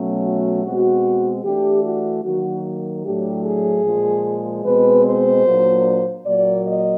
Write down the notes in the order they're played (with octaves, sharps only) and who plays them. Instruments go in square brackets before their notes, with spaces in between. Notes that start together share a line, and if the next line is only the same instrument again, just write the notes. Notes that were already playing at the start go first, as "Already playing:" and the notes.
Already playing: [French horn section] B2 F#3 A3 C#4
F#4
B2 G#3 C4 F#4
E3 A3 D4 G4
F#4
D#3 F#3 A#3 F#4
A2 F#3 A3 D4 G4
G#4
A#2 F3 G#3
B2 G#3 C4 B4
C5
A#2 F#3 A#3 D4
A#2 F#3 A#3 D5
D#5